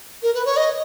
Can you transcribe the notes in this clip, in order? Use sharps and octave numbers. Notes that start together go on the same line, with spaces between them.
A#4
B4
C#5
D#5